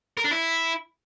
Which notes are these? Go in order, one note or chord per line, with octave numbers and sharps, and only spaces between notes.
A#4
D4
E4